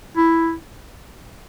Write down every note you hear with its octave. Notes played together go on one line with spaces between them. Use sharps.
E4